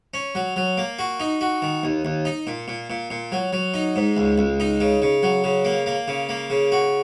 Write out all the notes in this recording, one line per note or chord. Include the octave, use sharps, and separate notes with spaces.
C#4
F#3
F#3
A#3
F#4
D#4
F#4
D#3
D#2
D#2
D#4
A#2
A#2
A#2
A#2
F#3
F#3
D#4
G#2
C#2
C#2
D#4
C#3
C#3
F#3
C#3
A#3
A#3
C#3
A#3
C#3
F#4